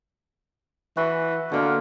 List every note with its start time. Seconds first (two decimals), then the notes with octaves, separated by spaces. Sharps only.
0.97 E3 F#4 G#5 B5
1.52 B2 D3 A#3 F4